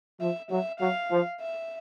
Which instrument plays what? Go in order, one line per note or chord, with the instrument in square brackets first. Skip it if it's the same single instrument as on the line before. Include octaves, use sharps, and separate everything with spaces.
[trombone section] F3 [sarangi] E5
[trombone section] F#3 [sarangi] E5
[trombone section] F#3 [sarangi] F5
[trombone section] F3
[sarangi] E5